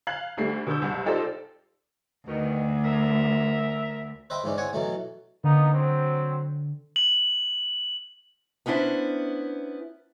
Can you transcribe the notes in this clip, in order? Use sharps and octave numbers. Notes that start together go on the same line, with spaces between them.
F5 F#6 G#6 F#7
D2 G3 A3 C7
B2 D3 E6 G6
F#1 C2
D#4 F4 G4 A4 C5 D5
D2 B2 D#3
A#4 E5
B4 C5 D#5 E5 G5 B5
G#2 E3 C#4 D4
B3 C4 C#5 F#5 G#5
B2 E3 F#3 A3
D3 A#3 B3 D#4
F#3 C4
F#7
B3 C#4 D4 E4 C5